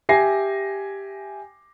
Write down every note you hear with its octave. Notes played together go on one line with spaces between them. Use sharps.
G4 E5 G#5 A#6 C7